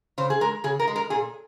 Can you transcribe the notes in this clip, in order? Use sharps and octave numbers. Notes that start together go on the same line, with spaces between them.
C#3 C5
G#4
G#3 A#4
C#3 G#4
A#4
G#3
A#4
A#2 G#4